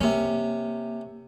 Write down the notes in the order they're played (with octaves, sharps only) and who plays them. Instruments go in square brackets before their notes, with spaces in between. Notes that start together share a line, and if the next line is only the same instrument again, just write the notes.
[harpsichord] C3 C#4 [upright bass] A#3